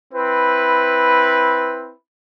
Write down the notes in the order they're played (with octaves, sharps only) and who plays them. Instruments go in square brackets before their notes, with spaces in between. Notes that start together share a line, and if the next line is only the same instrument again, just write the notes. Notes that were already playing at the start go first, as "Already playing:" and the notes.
[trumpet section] C4 E4 B4